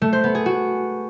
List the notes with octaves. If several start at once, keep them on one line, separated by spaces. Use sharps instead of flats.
A3
C5
B3
G#4
F#4